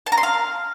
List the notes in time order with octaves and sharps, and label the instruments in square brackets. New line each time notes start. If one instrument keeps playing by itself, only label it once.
[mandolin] A5
A#5
C6
F5